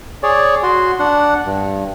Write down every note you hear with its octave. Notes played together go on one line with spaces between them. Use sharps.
G#4 C#5 D5
F#4 C6
D4 F#5
G2